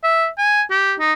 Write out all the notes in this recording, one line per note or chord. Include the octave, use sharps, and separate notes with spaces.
E5
G#5
G4
D#4